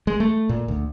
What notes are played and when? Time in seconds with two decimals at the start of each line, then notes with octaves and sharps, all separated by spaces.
0.07 G#3
0.20 A3
0.49 A#2
0.68 D2